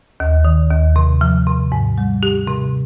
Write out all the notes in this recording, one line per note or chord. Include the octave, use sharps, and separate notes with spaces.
D#2
D#3
D#2
C3
F3
C3
G#2
G3
G4
C3